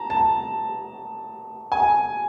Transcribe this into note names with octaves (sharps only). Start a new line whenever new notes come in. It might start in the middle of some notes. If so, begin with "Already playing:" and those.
Already playing: A5 A#5
A5
G#5